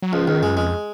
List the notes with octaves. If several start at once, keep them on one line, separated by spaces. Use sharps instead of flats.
F#3
C#2 F3
C#2 D#3
F#2 G#3
F2 G#3